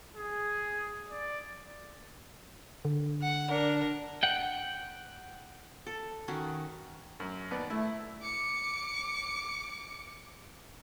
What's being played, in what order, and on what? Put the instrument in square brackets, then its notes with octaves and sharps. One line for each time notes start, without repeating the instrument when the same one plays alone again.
[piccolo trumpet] G#4
D5
[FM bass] D3
[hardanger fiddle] F#5
[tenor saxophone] D4 [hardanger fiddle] A#4
[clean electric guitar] F#5 G5
[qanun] A4
D#3 C#4 F#4
[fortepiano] F#2
D#2 B3 D5
[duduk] A3 [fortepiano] E4
[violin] D6 C#7